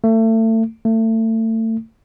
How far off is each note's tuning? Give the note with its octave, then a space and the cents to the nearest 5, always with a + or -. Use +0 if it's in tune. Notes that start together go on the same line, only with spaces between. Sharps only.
A3 +30
A3 +30